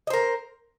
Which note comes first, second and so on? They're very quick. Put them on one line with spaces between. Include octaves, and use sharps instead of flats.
D#5 C5 A#4